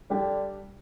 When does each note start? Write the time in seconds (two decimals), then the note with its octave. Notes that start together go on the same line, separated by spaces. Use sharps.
0.10 D3 G3 D4 G4